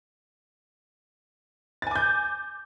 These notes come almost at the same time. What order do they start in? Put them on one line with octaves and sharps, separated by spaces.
A6 G#5 D6 G6